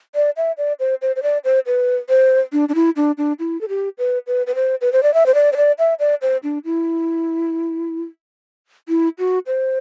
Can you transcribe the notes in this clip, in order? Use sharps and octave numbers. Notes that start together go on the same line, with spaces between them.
D5
E5
D5
C5
C5
C5
D5
C5
B4
C5
D4
D4
E4
D4
D4
E4
A4
G4
B4
B4
B4
C5
B4
C5
D5
E5
C5
D5
C5
D5
E5
D5
C5
D4
E4
E4
F#4
C5